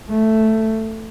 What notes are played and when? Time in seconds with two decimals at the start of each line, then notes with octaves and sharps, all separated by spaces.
0.09 A3